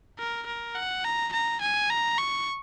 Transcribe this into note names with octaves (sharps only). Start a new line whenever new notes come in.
A#4
A#4
F#5
A#5
A#5
G#5
A#5
C#6